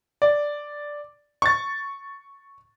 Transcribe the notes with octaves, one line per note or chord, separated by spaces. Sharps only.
D5
C#6 A6